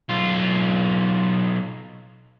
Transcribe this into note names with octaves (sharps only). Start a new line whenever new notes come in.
B1 F4